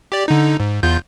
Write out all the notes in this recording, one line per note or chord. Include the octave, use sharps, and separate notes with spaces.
G4 D5
D3 D#4
G#2
E2 F4 G6